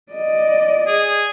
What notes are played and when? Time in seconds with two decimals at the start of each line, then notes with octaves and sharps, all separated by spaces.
0.12 D5 D#5
0.87 G#4